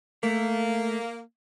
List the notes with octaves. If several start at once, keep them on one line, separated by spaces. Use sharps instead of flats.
A3 A#3